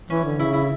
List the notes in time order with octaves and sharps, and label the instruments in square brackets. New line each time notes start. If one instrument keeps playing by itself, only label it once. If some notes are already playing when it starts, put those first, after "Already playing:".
[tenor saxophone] E3 [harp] C#4
[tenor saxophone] D3
[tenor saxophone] C#3 [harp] E4
[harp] E4